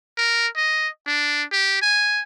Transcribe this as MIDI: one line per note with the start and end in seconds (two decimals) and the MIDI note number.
0.17 0.47 70
0.56 0.88 75
1.06 1.43 62
1.52 1.77 67
1.82 2.23 80